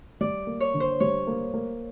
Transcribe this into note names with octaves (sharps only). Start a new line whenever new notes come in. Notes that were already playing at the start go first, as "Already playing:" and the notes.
G3 D5
A#3
C#5
D3
C5
G3 C#5
A#3
A#3